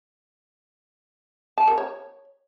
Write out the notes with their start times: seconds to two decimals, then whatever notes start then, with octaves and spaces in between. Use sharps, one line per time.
1.58 A5
1.68 A#4
1.78 C#5